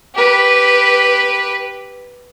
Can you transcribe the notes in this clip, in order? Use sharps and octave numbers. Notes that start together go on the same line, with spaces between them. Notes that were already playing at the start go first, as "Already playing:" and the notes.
G4 B4